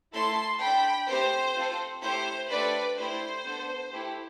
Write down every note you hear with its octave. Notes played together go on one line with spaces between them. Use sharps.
A3 E4 A4 A5 C6
D4 A4 G5 B5
A3 C4 G4 C5
C4 F4 A4
A3 E4 G4 C5
A3 D4 G4 B4 D5
A3 E4 G4 C5
B3 D4 A4
A3 E4 G4